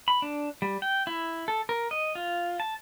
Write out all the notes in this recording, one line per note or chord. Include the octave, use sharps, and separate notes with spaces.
B5
D4
G3
G5
E4
A4
A#4
D#5
F4
A5